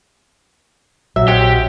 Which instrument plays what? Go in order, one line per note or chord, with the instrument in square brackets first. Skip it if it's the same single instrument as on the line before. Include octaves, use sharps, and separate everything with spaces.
[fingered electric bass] A#1 [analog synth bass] F#3 [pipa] E5
[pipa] G#3 C4 F#4 [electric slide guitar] G4